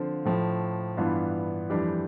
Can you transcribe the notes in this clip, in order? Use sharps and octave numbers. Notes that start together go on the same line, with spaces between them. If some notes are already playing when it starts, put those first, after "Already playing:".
Already playing: D3 F3 C4 F4
A2 F3 A3
G2 E3 B3 D4 F4
F2 E3 G3 D4 G4